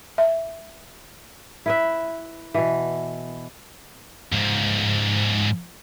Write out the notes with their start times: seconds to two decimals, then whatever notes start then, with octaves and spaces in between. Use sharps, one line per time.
0.18 E5
1.66 E4 B4 E5
2.54 B2 E3
4.32 G#2 F3